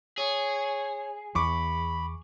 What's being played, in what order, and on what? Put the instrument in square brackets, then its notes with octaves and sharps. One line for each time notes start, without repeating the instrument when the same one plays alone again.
[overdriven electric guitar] G#4 [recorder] C#5
[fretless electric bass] E2 [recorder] B5 [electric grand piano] C#6 D6